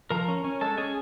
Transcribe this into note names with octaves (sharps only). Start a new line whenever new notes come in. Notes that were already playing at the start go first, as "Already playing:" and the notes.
F3 A#4 A#5
C#4
C#4
G#3 A4 A5
C#4 G#4 G#5